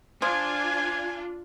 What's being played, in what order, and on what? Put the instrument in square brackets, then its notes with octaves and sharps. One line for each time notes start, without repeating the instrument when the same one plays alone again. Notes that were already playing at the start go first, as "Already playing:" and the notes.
[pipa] F3 [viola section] D4 F4 [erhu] G#5 [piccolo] G#6